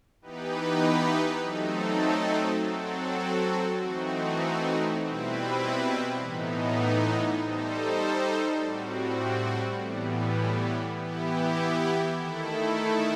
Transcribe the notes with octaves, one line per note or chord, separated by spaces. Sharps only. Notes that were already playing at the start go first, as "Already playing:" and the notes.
E3 B3 D#4 G4 B4
F#3 A3 C4 D#4 A4
F#3 C4 F#4 A4
E3 A3 C4 D#4 F#4
B2 G3 C4 E4 B4
A2 E3 B3 D#4
G3 D#4 A4 C5
A2 G3 C4 F#4
A2 E3 G3 B3
E3 B3 E4 G4
D#3 A3 E4 A4